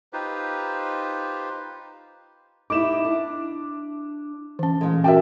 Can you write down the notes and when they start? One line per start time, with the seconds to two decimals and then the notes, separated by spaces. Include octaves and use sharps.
0.13 D#4 F4 G4 B4 C5
2.70 D#4 E4 D6 E7
3.05 D4
4.59 E3 C#4
4.81 A#2 G#3
5.04 C#4 F#4 A#4 E5 G5 A5